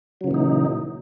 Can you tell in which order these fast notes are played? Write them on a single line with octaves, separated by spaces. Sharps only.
F#3 C#3 E3 A#2 D#4